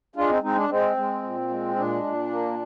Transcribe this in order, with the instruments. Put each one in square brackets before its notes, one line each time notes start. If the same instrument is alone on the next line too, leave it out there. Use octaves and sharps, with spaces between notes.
[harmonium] G#3 D4 F4
C4 D#4
G#3 C4 D#4
D4
G#3 C4
G#3
A#2
G#3
A#2 D4
A#2
A#3